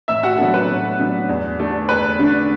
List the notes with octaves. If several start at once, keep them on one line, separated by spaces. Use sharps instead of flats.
A2 E5 E6
F#4 F#5
F#3 B3 D4 A4
B4
A2
F#3 B3 D4
E2
D3 A3 D4
E2 B4
D3 A3 D4